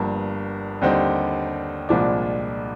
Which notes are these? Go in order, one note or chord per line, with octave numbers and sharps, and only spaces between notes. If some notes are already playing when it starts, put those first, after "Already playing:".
Already playing: G1 G2 F3 A#3
D#2 D3 G3 C4 D#4
C2 A#2 F3 G#3 D4